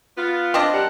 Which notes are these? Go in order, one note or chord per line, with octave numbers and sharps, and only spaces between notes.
B3 F4
C4 D4 D#5
G3 G4 A#4 D5 F#5 A5